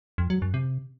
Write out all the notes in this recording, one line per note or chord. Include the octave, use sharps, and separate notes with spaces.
F2
F#3
F#2
C3